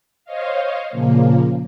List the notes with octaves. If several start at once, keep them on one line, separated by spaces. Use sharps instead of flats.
C5 C#5 D#5 F5
A#2 C#3 F3 A#3